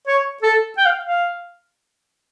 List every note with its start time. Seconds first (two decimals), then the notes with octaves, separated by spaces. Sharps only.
0.07 C#5
0.42 A4
0.77 G5
0.85 F5
1.03 F5